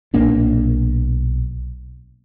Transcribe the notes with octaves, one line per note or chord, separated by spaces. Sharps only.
B1 A#2 A#3 D4